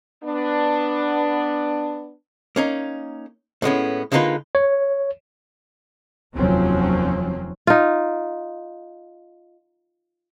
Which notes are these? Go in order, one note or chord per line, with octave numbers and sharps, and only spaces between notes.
B3 D4
A#3 C#4 D#4
A2 G#3 B3 C#4
D3 G#3 A#3 D#4 F4 B4
C#5
F1 D#2 F3 F#3 C4 C#4
D#4 F4